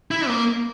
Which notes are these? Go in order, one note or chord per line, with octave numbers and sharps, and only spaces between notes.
E4
A#3